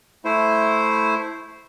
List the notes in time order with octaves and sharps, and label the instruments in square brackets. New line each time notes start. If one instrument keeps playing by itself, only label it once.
[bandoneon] A3 E4 C5